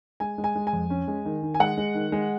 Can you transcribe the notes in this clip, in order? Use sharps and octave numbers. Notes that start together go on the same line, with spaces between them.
G#3 G#5
G#3
G#5
G#3
G#5
F2
C#4
G#3
D#3
D#3
G#5
G#3 F#5
G#3
D#3
G#3